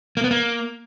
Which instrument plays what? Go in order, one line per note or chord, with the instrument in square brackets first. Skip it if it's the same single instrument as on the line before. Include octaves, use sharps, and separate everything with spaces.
[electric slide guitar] A#3
B3
A#3